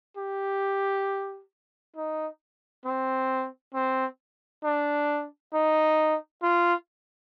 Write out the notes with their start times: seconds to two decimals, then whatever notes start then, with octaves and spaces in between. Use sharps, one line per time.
0.17 G4
1.96 D#4
2.86 C4
3.75 C4
4.64 D4
5.54 D#4
6.43 F4